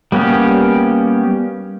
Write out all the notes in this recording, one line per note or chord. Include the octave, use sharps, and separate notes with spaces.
G3 A#3 B3 C#4 G4